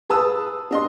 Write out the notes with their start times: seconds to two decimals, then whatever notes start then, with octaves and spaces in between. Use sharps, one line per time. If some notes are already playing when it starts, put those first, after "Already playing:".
0.10 G#4 B4 A5 D#6 E6
0.71 D4 D#5 C6